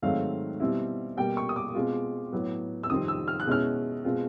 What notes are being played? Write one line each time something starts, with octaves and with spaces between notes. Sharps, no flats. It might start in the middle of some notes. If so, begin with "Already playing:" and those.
G#2 D#3 F#3 A3 C4 F5
B2 G3 C4 E4
B2 G3 A#3 G5
C#6
D#6
D6
B2 G#3 C4 F4
A2 F#3 B3
E6
F2 C3 D#3 G3 C4 D#6
E6
F6
F#6
B2 G#3 C#4 E4 F6
B2 G#3 C4 F4